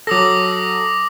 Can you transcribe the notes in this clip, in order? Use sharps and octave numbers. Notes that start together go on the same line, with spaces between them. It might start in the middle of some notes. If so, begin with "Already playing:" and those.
F#3 A4 D6 D#6 A#6